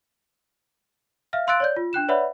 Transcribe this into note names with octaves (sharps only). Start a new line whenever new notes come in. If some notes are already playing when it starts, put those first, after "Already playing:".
E5 F5 F6
F5 C6 E6 F#6 A6 D7
C#5 D5 G6
F4
D4 G5 F#6 E7
B4 C#5 D5 E5 F#5 B5